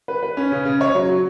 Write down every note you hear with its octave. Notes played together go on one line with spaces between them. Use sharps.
B4
B4
C#4
C#3
C#3
C#5
F#3
F#3